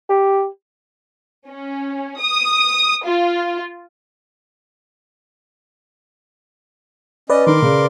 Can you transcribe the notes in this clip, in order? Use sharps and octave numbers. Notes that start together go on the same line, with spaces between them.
G4
C#4
D#6
F4
C#4 B4 D5 D#5
D#3 A#4 C6 D6
C#3